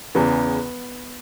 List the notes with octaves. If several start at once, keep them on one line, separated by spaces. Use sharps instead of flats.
E2 C#3 E3 B3